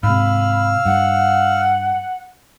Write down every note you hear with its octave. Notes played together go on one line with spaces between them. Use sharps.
G#2 C3 F5 B5 E6 F6
G2 F#5